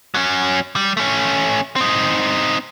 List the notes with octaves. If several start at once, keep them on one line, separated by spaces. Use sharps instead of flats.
F#3 C#4
G3
A3 C#4
C4 D#4